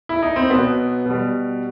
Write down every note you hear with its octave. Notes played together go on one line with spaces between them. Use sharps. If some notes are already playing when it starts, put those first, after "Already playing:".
E4
D#4
C4
B2 F#3 B3
B2 G3